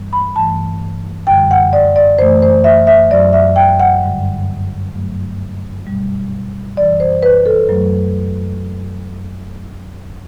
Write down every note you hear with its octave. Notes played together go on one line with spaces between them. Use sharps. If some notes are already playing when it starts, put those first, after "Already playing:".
Already playing: G2 E3 G3
B5
G2 E3 A3 A5
F#2 D3 G3 G5
F#5
D5
D5
F#2 E3 A3 C5
C5
E5
E5
F#2 F#3 A3 D5
E5
G5
F#5
G2 D3 G3
G2 F#3 A3
B2 G3
F#2 E3 G3 D5
C5
B4
A4
F#2 F#3 A3